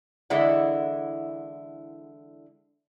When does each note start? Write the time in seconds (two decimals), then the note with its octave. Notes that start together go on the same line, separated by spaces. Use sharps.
0.30 D3 E3 G#3 D4 E4 F#5